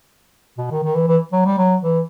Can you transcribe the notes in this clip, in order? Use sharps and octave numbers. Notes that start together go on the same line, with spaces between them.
B2
D#3
D#3
E3
E3
F#3
G3
F#3
E3